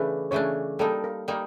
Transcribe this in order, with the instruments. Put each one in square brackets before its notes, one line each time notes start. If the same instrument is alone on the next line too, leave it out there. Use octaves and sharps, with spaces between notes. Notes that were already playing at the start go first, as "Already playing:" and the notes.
Already playing: [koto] C#3 E3 A3 D4 [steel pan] B4
[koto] C#3 E3 A3 D4 [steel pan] C#5
[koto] G3 A#3 D#4 [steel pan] A4
[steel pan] A#4
[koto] G3 A#3 D#4 [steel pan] A#4